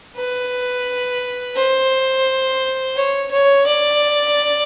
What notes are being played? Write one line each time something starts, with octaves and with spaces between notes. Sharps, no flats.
B4
C5
C#5
C#5
D5